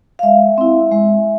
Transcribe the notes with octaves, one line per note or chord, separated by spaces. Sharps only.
F5
G#3 E5
C4 E4
G#3